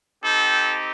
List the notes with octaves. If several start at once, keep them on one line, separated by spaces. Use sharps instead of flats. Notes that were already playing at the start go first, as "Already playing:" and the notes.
C4 D#4 G4 A4